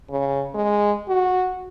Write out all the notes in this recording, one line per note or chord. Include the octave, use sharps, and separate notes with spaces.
C#3
G#3
F#4